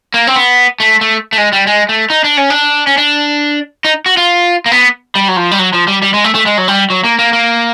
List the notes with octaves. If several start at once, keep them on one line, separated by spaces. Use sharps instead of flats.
A#3
C4
B3
A3
A3
A3
G#3
G3
G#3
A3
D#4
D4
C#4
D4
C#4
D4
D#4
F#4
F4
A#3
B3
G3
F#3
F3
G3
F#3
F3
G3
G3
G#3
A3
A3
G#3
F#3
G3
F#3
A#3
A#3
A#3